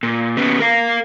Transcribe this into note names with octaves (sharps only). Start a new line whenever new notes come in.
A#2
C#3 B3
A#4 F5